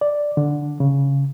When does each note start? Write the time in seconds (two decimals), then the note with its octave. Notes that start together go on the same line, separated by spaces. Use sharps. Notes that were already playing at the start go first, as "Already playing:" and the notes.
0.01 D5
0.37 D3
0.80 C#3